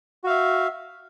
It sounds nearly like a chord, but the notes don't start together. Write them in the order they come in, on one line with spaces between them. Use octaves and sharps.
F#4 F5 E5